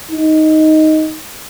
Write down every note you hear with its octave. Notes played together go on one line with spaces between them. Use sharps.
D#4